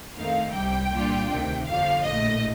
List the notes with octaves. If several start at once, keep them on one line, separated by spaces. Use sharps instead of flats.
F2 D#3 A3 C4 D#4 F5
C2 C3 G3 G5
A#2 G3 D4 F4
D2 C3 D#3
G1 F2 D3 F3 F5
A#1 A2 A3 D#5